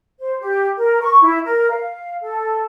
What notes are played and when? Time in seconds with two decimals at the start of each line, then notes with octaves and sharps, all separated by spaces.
0.20 C5
0.40 G4
0.78 A#4
1.02 C#6
1.22 E4
1.46 A#4
1.71 F5
2.22 A4